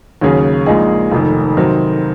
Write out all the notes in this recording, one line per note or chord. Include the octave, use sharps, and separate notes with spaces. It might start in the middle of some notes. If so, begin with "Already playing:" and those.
D#2 C#3 F#3 C#4 G#4
A#1 A#2 G#3 D#4 G#4
F1 F2 D#3
C3 D#3 F#3 C4